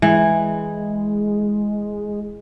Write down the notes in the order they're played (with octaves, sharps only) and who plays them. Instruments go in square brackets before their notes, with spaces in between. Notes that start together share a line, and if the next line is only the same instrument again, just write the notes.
[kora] E3 [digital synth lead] G#3